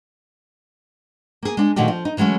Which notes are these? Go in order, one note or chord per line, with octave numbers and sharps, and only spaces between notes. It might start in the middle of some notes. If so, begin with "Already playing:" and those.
A#3 G#4
G#3 D4
A#2 D#3 F3 A3 F#4 G4
F3
D#4
E3 F#3 G#3 A3 C#4